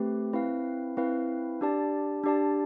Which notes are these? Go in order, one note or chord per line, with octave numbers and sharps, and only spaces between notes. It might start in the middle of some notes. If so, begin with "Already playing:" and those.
Already playing: A3 C4 G4 B4
C4 E4 B4 F5
C4 E4 B4 F5
D4 G4 D5 A5
D4 G4 D5 A5